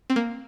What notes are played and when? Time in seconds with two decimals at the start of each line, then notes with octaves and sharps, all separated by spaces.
0.10 C4
0.16 A#3